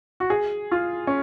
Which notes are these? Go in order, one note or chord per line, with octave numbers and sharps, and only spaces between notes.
F#4
G#4
F4
C#4